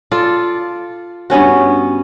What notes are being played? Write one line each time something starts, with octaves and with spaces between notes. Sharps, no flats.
F4 A4 D5
G2 B3 C#4 F#4